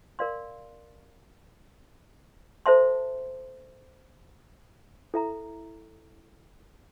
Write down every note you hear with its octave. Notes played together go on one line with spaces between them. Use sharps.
A#4 D5 F5 C6
A4 C5 E5 A5 C6
E4 A4 E5 A#5